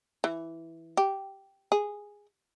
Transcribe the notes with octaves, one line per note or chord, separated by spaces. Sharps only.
E3
G4
G#4